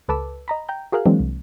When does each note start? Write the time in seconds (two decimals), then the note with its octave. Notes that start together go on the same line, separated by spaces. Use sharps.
0.08 C#2 A4 B4 A5 D6 E6
0.48 D#5 A#5 B5
0.69 G5 A#5 G6
0.92 F#4 G#4 A#4 F5 F#6
1.06 E3 F#3 G#3 A#3 C4 D4
1.19 C2